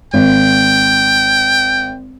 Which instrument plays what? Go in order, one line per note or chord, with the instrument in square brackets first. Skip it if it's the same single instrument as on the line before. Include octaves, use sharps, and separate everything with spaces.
[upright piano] G#1 [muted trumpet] G5